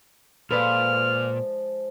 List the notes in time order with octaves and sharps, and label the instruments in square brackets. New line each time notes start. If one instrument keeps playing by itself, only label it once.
[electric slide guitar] A#2 [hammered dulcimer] F3 G#3 [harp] A4 B4 D5 [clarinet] F6